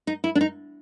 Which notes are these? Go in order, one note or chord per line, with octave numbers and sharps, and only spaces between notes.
D#4
E4
D4
D#4